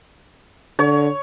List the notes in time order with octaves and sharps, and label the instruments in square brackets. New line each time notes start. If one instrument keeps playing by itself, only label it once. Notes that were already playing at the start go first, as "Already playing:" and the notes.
[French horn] D3 [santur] C#5